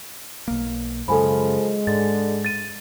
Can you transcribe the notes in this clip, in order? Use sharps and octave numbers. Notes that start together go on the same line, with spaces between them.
B1 A#3
F#2 C#3 F3 G#3 A4 G#5 B5
G#2 D3 A6
A6 D#7